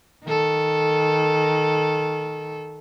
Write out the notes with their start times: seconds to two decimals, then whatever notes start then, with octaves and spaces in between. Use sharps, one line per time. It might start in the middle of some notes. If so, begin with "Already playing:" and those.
0.24 D#3 A4